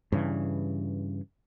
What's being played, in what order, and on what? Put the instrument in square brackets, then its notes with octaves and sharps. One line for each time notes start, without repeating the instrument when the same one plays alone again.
[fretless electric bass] G2 C#3 E3